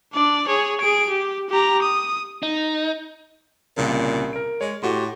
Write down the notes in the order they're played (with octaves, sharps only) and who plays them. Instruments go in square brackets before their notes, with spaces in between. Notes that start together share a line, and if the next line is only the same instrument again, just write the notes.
[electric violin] D4 D5
G#4 C#5
G#4 D7
G4
G4 A#5
D#6
[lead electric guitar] D#4
[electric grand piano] C2 C#3 [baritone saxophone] A#2
[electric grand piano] A#4 D7
[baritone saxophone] G#3 [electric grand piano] C#5
[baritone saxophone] A2 [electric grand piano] F#4 G4 C6